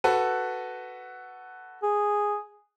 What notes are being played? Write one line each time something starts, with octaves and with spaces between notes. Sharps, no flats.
F#4 A4 B4
G#4